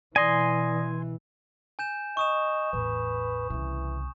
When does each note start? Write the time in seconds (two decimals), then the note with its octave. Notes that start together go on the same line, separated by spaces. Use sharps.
0.16 B2 E3 D5 G#5 C6 D#6 A#6
1.79 G#5 G6 E7
2.17 D#5 C#6 D#6 E7
2.73 A1 E2 B4
3.50 C2 C#3 E3